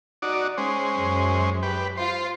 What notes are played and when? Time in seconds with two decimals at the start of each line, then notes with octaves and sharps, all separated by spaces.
0.22 D#4 F#4 D5
0.58 G#3 C#4 C5
0.97 F#2
1.63 G4 B4
1.97 F4 C5